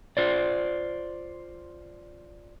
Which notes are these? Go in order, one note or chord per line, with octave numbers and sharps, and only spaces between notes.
F4 C5 D5